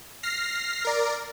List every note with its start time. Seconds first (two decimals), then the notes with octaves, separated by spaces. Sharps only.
0.23 F6 A#6 C7
0.85 A#4 D5